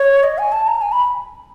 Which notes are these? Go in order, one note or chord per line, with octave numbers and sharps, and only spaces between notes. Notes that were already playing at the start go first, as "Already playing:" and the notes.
Already playing: C#5
D#5
G#5
A5
A#5
G#5
B5